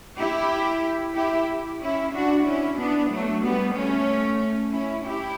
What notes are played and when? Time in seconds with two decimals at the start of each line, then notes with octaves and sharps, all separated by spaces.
0.19 E4 G4
1.16 E4 G4
1.81 C#4 E4
2.13 D4 F#4
2.46 C#4 E4
2.79 B3 D4
3.11 F#3 A3
3.44 G3 B3
3.76 A3 C#4
4.73 C#4 E4
5.05 E4 G4